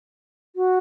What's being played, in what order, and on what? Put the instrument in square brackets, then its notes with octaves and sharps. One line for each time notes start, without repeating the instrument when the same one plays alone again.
[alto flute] F#4